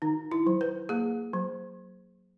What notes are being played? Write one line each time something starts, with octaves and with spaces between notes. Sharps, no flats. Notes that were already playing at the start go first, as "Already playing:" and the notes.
D#3 D#4
E4
F#3
B4
A#3 G#4
F#3